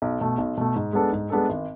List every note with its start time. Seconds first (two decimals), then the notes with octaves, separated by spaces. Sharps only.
0.02 B1
0.21 B2 A3
0.38 B1
0.57 B2 A3
0.75 G#2
0.93 G#3 B3 D4 A4
1.12 G#2
1.30 G#3 B3 D4 A4
1.49 G#1